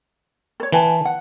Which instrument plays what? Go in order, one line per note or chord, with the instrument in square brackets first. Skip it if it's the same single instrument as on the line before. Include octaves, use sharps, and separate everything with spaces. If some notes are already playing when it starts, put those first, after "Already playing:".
[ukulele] A4 C#5
[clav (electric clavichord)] E3 [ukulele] B4 G#5 A5
[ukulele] F#5